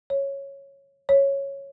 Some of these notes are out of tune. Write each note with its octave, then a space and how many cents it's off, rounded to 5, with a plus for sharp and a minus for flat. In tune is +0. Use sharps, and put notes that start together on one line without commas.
C#5 -5
C#5 -5